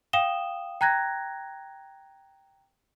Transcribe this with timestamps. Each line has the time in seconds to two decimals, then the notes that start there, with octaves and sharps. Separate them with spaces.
0.13 F5 G5 D#6 E7 G7
0.81 G5 A#5 F#6 G#6 A#6